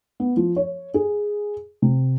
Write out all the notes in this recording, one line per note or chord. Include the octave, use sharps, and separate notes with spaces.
B3
F3
C#5
G#4
C3